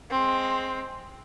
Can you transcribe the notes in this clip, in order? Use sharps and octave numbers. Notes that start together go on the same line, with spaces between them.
G#3 C4